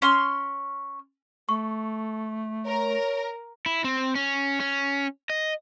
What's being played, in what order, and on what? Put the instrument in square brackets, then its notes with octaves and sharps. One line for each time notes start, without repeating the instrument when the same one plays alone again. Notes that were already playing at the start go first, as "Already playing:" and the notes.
[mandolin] C#4 C6 F6
[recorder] A3 [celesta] C#6
[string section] A#4 [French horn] C#5
[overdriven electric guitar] E4
C4
C#4
C#4
D#5